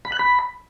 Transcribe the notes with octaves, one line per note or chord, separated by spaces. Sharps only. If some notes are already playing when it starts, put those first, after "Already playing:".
B5
F#6
B5